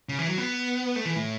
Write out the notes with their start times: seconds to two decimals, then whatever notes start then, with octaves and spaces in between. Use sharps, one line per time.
0.09 C#3
0.19 E3
0.28 F#3
0.38 B3
0.96 A3
1.06 E3
1.16 A2